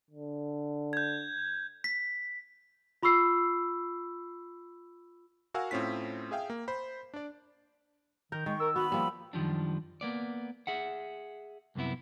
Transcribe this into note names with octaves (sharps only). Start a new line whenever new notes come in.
D3
G6 G#6
B6
F4 B5 C#6 E6 C7
F#4 A#4 F5 F#5 G#5 E6
A2 C4 C#4 F4 B6
G#4 E5 F5 G5
A#3
C5 B5
D4 D5
D#3 A#4 G6
D#3 G#3 C#6
A#4 E6
B3 F#4 B5
F3 G3 A#3
F#2 D#3 F3 G3 D4
A#3 B3 D5
G#4 E5 F#5
C2 F#2 C3 B3 E4